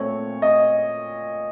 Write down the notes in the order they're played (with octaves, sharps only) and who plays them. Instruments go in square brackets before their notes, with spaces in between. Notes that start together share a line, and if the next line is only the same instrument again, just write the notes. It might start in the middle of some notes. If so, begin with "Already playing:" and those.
Already playing: [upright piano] A#2 A3 C4 C#5
D#5